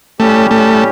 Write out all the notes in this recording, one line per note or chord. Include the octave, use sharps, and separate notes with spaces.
A2 G3 A3 C#4 G4
A3